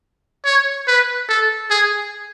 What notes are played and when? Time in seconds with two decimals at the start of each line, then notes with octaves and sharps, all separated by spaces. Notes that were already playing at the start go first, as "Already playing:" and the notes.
0.45 C#5
0.87 B4
1.29 A4
1.70 G#4